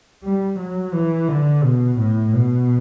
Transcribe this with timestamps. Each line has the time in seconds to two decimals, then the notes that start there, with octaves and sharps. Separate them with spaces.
0.23 G3
0.59 F#3
0.93 E3
1.28 D3
1.63 B2
1.99 A2
2.33 B2